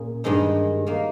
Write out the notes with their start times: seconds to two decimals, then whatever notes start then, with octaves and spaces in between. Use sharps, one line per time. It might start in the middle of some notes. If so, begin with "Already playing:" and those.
Already playing: A#2 C#4 G#4
0.24 G2 D#3 G#3 D#4
0.87 D#3 A#3